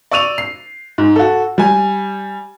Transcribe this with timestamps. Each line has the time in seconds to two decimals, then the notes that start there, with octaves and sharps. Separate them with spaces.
0.11 D5 C#6 E6 D#7 F7
0.38 C7
0.98 G#2
1.16 F#4 A4
1.58 G3 G#5